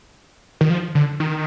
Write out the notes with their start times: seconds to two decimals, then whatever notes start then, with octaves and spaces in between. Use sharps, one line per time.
0.61 D#3
0.70 F3
0.95 D3
1.20 D#3